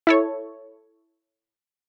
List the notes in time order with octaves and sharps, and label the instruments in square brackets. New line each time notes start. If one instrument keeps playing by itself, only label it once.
[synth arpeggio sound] E4 A4 C#5